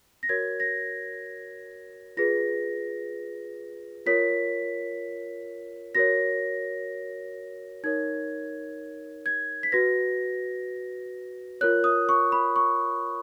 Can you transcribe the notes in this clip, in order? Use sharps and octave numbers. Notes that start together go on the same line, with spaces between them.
A#6
F#4 A#4 C#5 G#6
A#6
F4 G#4 B4 A#6
F4 A#4 C#5 B6
F#4 A#4 C#5 A#6
D#4 A#4 C#5 G#6
G#6
B6
F#4 B4 A#6
F4 A#4 C#5 F#6
D#6
C#6
B5
C#6